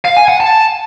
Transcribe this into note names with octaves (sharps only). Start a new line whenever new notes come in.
F5
G#5
F#5
A5